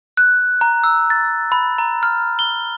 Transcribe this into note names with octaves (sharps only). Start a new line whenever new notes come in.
F#6
A#5
E6
A6
B5
A#5
F6
G7